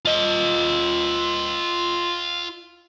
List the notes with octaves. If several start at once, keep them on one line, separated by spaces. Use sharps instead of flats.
F4 D#5